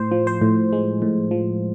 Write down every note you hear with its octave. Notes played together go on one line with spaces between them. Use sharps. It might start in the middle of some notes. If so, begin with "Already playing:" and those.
Already playing: A2 C5
F3
C5
A2
G#3
A2
F3